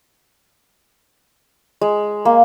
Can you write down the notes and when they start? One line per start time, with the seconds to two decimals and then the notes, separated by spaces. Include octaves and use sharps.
1.81 G#3
2.25 A#3